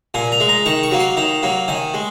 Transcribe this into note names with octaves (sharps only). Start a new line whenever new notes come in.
A#2 G#5
A#5
G#3
A#5
D#3 C#6
C#6
F#3 A#3
C6
D#3 A#5
F#3 A#3
D#3 G#5
G#3